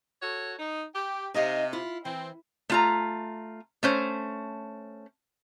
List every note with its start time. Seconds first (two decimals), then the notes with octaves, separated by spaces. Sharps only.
0.21 F#4 A4 C#5
0.59 D#4
0.94 G4
1.34 C3 D#4 D#5 F5
1.73 E4 F4
2.05 E3 C4
2.70 A3 F4 A#5
3.83 A3 C#4 C5